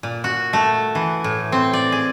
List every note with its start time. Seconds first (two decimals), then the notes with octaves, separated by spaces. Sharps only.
0.03 A#2
0.24 F#4
0.53 A3
0.95 E3
1.24 A2
1.52 C4
1.73 D5
1.92 G#4